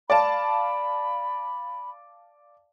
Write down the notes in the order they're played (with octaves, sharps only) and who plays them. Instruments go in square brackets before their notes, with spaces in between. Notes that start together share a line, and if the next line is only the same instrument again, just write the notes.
[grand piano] D5 F5 A5 [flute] B5